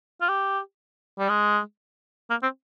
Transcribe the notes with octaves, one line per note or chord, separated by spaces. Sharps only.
F4
G4
G3
G#3
A#3
C4